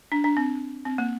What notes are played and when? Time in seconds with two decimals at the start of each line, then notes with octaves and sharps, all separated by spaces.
0.12 D4
0.24 D4
0.37 C4
0.86 C4
0.98 A#3